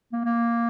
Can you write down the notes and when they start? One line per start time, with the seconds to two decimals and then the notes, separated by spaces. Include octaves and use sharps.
0.12 A#3
0.25 A#3